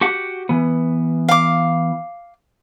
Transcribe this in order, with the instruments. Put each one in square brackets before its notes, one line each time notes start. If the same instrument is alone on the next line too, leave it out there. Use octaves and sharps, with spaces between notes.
[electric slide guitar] F#4 G4 F#5
E3 B3
[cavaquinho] F5 D6